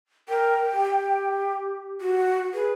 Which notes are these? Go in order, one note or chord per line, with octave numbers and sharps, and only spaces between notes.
A#4 G5
G4
F#4
G#4 B4